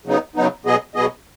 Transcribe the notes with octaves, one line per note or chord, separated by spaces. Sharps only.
C#3 F#3 B3 D#4
C#3 F#3 B3 D#4
B2 F#3 B3 G#4 D#5
B2 F#3 B3 G#4 D#5